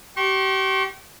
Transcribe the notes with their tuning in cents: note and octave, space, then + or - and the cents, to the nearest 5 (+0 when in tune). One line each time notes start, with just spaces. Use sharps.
G4 -35 C#6 -45